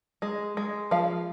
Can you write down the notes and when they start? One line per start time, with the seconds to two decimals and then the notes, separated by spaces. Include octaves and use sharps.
0.22 G#3
0.57 G#3
0.91 F3 F5